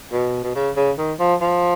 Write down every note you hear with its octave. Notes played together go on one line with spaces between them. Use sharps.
B2
B2
C#3
C#3
D#3
F3
F3